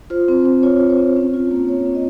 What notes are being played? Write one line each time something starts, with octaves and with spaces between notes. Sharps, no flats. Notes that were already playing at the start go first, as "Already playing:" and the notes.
F4 C5
C4
C4
F4 C#5
F4
C5
C4
C#4
F4
A#3
A#3 C#5
C#4
D#5